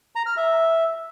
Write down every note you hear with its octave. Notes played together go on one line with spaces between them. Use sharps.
A#5
F6
E5